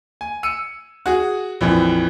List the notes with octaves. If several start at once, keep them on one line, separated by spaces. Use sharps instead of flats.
G#5
E6 C#7 D#7
F#4 G#4
A#1 F2 E3